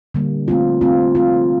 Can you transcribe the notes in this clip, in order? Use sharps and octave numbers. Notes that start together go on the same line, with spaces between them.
D3 G3 A#3
A3 C4 F4
A3 C4 F4
A3 C4 F4